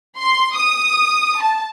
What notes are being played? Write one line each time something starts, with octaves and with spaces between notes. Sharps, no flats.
C6
D#6
A5